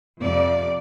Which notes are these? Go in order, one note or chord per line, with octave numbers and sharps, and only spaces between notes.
F2 C3 D5